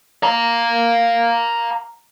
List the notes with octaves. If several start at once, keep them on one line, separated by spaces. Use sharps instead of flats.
F5 A#5